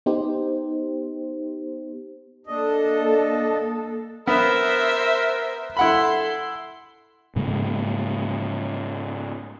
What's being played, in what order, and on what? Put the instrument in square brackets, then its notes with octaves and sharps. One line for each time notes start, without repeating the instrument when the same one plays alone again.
[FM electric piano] B3 D#4 G4 C5
[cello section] A#3 A4 [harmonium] D4 D#5
[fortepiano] B3 [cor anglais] A#4 [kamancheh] C5 E5
[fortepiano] E4 F#5 B5 [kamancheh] A4 C6
[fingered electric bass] G#2 C#3 G#3 A#3